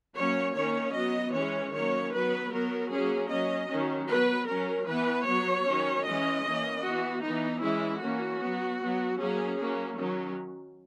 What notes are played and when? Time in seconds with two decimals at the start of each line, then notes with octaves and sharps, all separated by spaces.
0.18 F#3 A#3 C#4 C#5
0.57 D#3 A#3 C#4 C#5
0.96 F#3 B3 D#5
1.36 E3 G#3 C#4 C#5
1.75 D#3 F#3 A#3 C#4 C#5
2.14 F#3 B3 B4
2.53 F#3 B3 A#4
2.93 F#3 A#3 C#4 G#4
3.32 F#3 C#4 D#5
3.71 D#3 F#3 C#4
4.10 F#3 B3 B4
4.49 F#3 C#4 A#4
4.88 E3 B3 B4
5.27 F#3 B3 C#5
5.68 D#3 F#3 C#4
6.06 E3 G#3 C#4 D#5
6.45 E3 A#3 C#4
6.84 E3 B3 F#4
7.24 E3 B3 D#4
7.63 E3 G#3 C#4 E4
8.02 E3 A#3 C#4 F#4
8.42 F#3 B3
8.81 F#3 B3
9.19 F#3 A#3 C#4 G#4
9.59 F#3 A#3 C#4
9.98 D#3 F#3 C#4